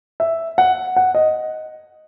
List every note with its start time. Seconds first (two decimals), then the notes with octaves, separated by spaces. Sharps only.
0.20 E5
0.58 F#5
0.96 F#5
1.15 D#5